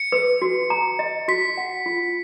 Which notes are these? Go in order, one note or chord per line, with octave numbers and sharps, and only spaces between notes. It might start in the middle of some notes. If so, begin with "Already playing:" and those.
Already playing: C#7
B4
F#4
A#5
D#5
F#4 B6
F#5
F4